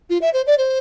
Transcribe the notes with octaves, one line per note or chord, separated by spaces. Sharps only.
F4
E5
C5
D5
C5